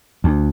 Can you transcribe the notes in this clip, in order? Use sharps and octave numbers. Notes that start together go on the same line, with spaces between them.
D2